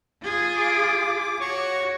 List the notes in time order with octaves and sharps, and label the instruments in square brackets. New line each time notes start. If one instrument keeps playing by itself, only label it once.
[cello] F4 G#4
[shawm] D6
[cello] F#4 [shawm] C#5